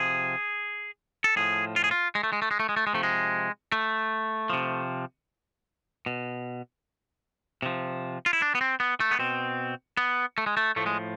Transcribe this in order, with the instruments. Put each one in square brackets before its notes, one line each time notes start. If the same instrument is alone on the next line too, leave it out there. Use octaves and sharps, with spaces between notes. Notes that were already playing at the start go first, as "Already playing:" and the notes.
Already playing: [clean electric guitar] C3 F3 G#4
A4
A2 F3 G#4
F4
G#4
F4
G#3
A3
G#3
A3
G#3
A3
G#3
A3
G#3
C3 F3 A3
G#3
A3
C3 F3
B2
C3 F3
F4
E4
D4
B3
C4
B3
A3
B3
B2 C4
B3
A3
G#3
A3
A2 F3 A3
G#3